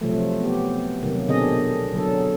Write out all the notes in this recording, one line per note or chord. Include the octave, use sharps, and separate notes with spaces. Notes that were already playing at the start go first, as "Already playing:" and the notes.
C3 F3 F#3 A3
B3 G4
C3 D#3 F#3 A#3
B2 D3 C4 D4 G#4 D#5
D3 F#3 A4